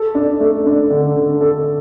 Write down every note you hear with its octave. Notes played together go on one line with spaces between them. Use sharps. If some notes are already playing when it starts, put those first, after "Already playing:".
Already playing: A4
D4
A3
D4
D3
D3
A4